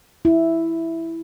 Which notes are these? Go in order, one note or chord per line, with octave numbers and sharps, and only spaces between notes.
E4